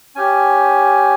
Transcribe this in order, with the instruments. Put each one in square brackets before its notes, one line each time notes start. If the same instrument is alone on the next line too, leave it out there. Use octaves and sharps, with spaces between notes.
[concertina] C#4 G4 G#5